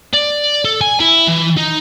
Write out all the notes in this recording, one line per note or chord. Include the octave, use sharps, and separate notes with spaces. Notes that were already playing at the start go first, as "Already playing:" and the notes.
D5
A4
G#5
E4
E3
D#4